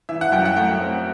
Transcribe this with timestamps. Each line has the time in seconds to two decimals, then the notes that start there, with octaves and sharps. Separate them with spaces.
0.09 E3 E5
0.21 F#5
0.32 F#2 G5
0.45 F#5
0.56 A3 G5
0.81 C4